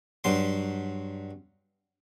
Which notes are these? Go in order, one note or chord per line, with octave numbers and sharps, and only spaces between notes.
G2 F#3 C6